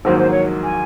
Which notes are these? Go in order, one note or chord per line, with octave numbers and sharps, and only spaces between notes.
A#1 G#2 D#3 F#3 A#3 C5
C5
C#5
G#5